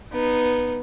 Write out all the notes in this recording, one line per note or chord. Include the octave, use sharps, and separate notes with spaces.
B3 D#4